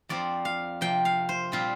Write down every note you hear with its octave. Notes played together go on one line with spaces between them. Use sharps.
F2 F3 C4 D5
F5
C3 F3 A#3 G5
F5
C5
A#2 G3 C4 F4